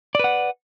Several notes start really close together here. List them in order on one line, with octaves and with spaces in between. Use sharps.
D5 B4 F#5